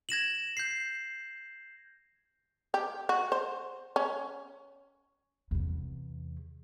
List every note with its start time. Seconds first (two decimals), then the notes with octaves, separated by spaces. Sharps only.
0.09 G#6 A#6 E7 F#7
0.57 G6 C7
2.74 G4
3.09 F#4
3.32 C5
3.96 C#4
5.51 E2 C3